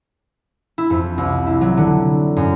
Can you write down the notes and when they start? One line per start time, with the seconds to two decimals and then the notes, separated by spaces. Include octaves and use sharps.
0.78 E4
0.90 F2
1.18 C2
1.47 E4
1.61 F#3
1.77 D3
2.36 F#2